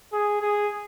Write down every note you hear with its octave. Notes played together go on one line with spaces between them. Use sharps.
G#4
G#4